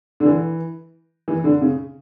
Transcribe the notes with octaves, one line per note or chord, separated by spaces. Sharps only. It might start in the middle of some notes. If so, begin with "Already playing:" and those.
D3
E3
E3
D3
C#3